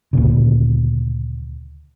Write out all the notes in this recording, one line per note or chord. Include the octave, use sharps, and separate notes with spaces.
D2 A#2 C#3